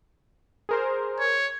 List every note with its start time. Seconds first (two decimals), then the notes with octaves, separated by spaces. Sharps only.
0.69 G#4 A#4 C5
1.20 C#5